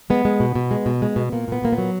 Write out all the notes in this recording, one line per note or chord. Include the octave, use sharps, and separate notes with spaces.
G#3 B3
G#3
B2
B2
G#3
B2
G#3
B2
A#2 A#3
A#2 B3
A#2 A#3
B3
F#3